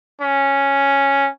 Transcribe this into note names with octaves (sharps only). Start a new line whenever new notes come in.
C#4